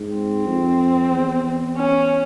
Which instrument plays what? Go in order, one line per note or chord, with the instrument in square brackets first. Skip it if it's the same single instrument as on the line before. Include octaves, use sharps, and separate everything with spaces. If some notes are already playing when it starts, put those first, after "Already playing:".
Already playing: [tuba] G#2
[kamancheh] C4
[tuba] F2
E2
[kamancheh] C#4